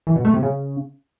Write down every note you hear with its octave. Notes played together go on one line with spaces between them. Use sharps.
E3
B2
A3
C3
C#3